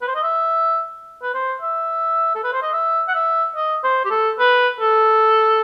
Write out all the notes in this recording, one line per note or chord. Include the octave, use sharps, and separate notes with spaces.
B4
C5
D#5
E5
B4
C5
E5
A4
B4
C5
D#5
E5
F#5
E5
D#5
C5
G4
A4
B4
A4